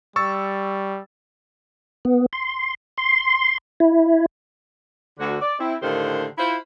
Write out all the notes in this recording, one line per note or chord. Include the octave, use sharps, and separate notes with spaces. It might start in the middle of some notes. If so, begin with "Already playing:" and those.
G3 C#6 E6 A6
B3
C6
C6
E4
D2 D3 F#4
D5
C4 E4
A2 D3 D#3 A#3 G4 C5
E4 F4 C5